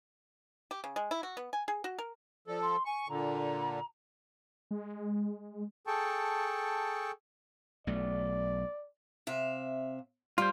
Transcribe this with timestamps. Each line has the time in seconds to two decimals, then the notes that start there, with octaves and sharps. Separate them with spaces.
0.71 G4
0.84 C#3
0.96 G#3
1.11 E4
1.23 F#4
1.37 B3
1.53 G#5
1.68 G#4
1.84 F#4
1.99 A#4
2.48 F3 A4 D5
2.61 C6
2.85 G#5 C#6
3.09 A#2 D3 A#5
4.71 G#3
5.87 G#4 A4 G5 A5 C#6
7.87 B1 A3 D5
9.27 C3 E5 F5
10.38 G3 F4 C5